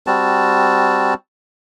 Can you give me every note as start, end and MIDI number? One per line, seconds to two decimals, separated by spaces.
0.07 1.14 55
0.07 1.14 60
0.07 1.14 66
0.07 1.14 81